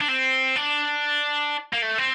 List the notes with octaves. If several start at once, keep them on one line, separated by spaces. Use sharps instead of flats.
D4
C4
D4
A#3
A3
C4